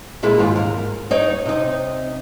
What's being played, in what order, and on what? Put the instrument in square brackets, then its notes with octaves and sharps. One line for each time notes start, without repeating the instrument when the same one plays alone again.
[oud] A#2 G#3 E4
D#2 G#2 F4
A#4
D#4 C#5 D5
C3 D#4